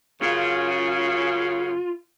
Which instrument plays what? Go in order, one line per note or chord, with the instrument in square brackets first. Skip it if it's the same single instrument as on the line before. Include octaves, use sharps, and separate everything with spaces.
[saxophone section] F#2 C#3 [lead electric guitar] F4